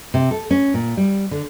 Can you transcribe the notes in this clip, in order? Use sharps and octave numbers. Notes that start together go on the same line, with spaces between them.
C3
A4
C#4
A#2
G3
D3